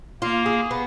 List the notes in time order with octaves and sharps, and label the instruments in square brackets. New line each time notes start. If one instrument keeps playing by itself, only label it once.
[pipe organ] A#3 [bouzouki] F4
[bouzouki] G#4
B3